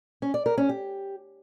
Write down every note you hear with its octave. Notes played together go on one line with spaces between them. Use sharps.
C#4
D5
A#4
C#4
G4